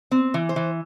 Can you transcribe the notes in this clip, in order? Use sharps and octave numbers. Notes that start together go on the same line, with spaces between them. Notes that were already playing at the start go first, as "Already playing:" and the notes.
C4
E3
C5
E3